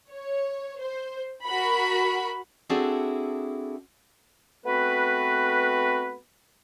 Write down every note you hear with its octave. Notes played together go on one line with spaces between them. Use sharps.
C#5
C5
F#4 A#4 B5
C4 D4 E4 F#4 G#4 A4
A3 B3 C4 F#4 B4